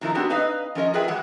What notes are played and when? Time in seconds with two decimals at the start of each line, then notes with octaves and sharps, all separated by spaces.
0.01 A#2 D#3 F3 A#3 E4 A#4
0.15 B3 C4 D4 F#4 G4
0.30 C4 D#4 B4 D#5 F5
0.75 F3 C#4 A#4 D#5
0.94 F4 G#4 B4 E5 G5
1.08 E3 F#3 G#3 F#5